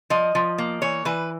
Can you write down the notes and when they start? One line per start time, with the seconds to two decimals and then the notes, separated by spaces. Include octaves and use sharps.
0.10 F3 D#5
0.35 F3
0.58 A#3
0.82 E3 C#5
1.05 E3 B4